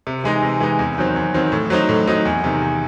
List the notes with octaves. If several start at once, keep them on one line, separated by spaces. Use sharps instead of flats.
C3
E3 G#3 D#4
C3
E3 G#3 D#4
E2
D#3 F#3 C4
E2
D#3 F#3 C4
A2
F#3 C4 D#4
A2
F#3 C4 D#4
E2
C3 D#3
E2